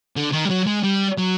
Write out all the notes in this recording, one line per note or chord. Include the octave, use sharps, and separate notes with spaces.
D3
D#3
G3
F#3
G#3
G3
F#3